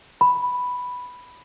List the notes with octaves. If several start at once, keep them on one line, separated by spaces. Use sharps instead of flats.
B5